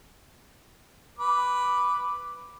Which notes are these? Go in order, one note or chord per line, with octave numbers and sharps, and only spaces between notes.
B4 D6